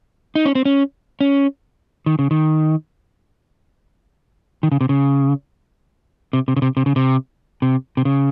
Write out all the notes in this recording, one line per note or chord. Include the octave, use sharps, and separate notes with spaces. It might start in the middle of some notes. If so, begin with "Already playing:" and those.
D#4
C#4
C4
C#4
C#4
D#3
C#3
D#3
D#3
C#3
C3
C#3
C3
C3
C#3
C3
C3
C#3
C3
C3
C3
C#3